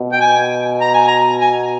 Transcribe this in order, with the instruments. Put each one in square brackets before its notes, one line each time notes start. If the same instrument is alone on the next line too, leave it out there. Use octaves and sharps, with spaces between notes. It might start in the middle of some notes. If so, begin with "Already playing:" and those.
Already playing: [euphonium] B2
[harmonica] G5
G#5
A#5
G#5
A#5
G#5